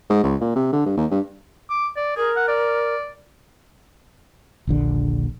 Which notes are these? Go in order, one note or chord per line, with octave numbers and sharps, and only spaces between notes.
G#2
C#2
A#2
C3
D3
G2
D#2
G2
D6
D5
G#4 A#4
F#5
D5
D#1 A#1 D3